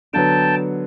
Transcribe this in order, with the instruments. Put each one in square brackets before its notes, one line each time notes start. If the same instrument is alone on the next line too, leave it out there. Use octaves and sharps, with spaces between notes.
[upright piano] D3 F#3 B3 [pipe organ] G5 A5